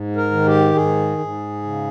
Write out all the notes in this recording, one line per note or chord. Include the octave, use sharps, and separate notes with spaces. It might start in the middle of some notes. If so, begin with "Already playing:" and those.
Already playing: G#2
A#4
D#3
G4
G#2 G#4
G#2
C#3